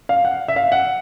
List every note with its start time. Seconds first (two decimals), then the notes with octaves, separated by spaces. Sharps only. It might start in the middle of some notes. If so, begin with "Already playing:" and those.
0.09 F5
0.25 F#5
0.48 E5
0.56 F5
0.72 F#5